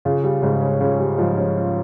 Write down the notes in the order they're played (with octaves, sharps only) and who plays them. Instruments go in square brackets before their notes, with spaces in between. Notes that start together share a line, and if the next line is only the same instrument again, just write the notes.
[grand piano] C#3 [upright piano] F4
[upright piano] G3
[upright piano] G#2 [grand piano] C#3
[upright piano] C#4
[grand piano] C#3 [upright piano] F4
[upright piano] G3
[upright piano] G#2 [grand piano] F3
[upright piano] C#4
F4